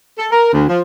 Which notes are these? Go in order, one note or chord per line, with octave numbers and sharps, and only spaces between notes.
A4
A#4
D2
F3